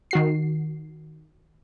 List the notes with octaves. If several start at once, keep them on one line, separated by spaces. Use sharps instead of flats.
D#3 F#4 C7